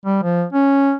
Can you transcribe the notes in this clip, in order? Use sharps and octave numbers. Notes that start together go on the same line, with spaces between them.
G3
F3
C#4